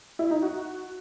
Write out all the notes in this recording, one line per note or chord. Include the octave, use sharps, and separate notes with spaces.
E4
D#4
F#4